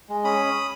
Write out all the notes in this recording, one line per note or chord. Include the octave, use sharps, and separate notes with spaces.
G#3
C#4 B5 D#6